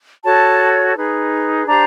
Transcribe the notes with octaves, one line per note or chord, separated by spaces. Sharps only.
F#4 A4 C#5 A5
D#4 G#4 B4
D4 G4 C5 A#5